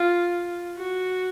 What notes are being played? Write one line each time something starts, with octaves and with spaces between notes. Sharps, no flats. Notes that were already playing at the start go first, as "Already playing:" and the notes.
Already playing: F4
F#4